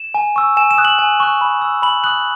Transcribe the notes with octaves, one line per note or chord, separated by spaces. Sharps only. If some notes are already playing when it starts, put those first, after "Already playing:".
Already playing: E7
G#5
C#6 E6
G#5 E7
E7
D#6 F#6
F#7
G#5
C#6 F#6
B5
E6
B5 F#7
D#6 F#6 F#7